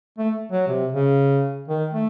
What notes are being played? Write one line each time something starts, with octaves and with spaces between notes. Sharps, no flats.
A3
F#3
C3
C#3
D#3
A3